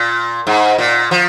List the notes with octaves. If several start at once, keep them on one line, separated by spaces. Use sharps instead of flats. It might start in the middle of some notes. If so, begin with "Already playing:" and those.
Already playing: A#2
G#2
A#2
F3